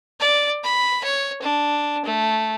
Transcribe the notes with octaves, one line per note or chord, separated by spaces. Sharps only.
D5
B5
C#5
D4
A3